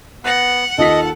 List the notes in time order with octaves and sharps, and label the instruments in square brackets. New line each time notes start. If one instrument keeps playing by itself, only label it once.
[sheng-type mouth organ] B3 [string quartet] F#5 [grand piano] F#6 A6 A#6
[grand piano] D#2 F4 B6 [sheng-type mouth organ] A4 [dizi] D#5